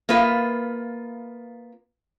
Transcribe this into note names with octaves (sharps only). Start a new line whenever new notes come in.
A#3 B3 F4 B4 E5